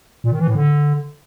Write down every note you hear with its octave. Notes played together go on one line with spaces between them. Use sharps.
A#2
D#3
E3
A2
D3